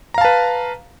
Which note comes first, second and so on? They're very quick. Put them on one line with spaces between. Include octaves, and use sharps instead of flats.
A#5 F5 A5 B4